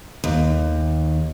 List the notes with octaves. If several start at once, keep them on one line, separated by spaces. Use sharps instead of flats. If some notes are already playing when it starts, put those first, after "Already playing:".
D#2